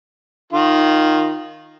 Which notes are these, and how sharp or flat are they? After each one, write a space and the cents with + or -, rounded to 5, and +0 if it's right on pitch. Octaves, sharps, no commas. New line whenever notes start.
D#3 -5 F4 +0